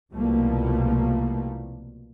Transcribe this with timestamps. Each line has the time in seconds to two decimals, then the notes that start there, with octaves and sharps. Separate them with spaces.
0.11 C2 B2 F3 G3 A3 A#3